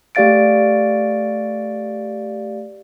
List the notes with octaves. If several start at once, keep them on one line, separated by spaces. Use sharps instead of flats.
A3 G4 D5 F5 A6 D7